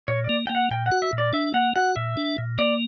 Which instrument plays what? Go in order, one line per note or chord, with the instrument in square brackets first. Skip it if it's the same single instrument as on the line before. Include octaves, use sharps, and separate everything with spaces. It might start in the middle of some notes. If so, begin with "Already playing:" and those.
[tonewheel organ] A#2 [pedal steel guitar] C#5
[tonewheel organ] A#3 [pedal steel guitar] D5
[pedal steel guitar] G5
[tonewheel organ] A#3
[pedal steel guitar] F#5
[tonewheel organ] A#2 [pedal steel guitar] G5
[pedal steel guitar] F#5
[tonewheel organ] F#4
[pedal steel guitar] E5
[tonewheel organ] A#2
[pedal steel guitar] D5
[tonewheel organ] D4 [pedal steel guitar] E5
[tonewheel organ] A#3 [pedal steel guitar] F#5
[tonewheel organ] F#4 [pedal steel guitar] F#5
[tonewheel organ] A#2 [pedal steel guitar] E5
[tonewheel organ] D4
A#2
[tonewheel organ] A#3 [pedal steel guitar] D5